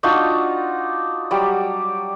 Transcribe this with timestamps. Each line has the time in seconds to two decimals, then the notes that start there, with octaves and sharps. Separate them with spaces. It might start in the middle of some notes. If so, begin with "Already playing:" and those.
0.03 D4 D#4 F4 F#4
1.31 F#3 G3 G4 D5